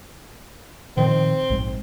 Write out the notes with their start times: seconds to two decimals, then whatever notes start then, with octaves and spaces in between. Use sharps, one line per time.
0.97 A#2 D#3 F3 C4
1.50 A#1 G#2 G#3